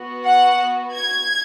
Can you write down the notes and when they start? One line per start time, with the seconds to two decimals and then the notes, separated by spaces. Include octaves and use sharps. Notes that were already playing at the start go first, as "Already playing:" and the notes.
Already playing: B3 F#4
0.26 F#5
0.96 G#6